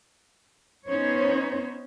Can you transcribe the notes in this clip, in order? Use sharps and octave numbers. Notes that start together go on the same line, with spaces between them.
B3 C#4 D#4 C5 C#5